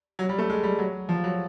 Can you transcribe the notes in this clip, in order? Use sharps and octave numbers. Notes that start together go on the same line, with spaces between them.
F#3
G3
A3
G#3
G3
F#3
F3
F#3